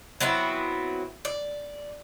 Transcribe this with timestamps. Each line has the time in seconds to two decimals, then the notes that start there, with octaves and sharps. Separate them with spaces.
0.20 F#3 B3 C4 E4
1.25 D5